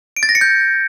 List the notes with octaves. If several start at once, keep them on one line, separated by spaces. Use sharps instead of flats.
D7
A6
A#6
C#7
G6